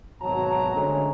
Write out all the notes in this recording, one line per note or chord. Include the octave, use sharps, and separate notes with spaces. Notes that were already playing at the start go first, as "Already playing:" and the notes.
G#1 B2 F#3 A5 A#5
D3 G#3 A3 C#4